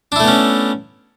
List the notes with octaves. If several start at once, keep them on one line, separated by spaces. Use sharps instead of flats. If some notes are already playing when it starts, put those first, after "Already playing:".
A3 B3 C#4 D4 E4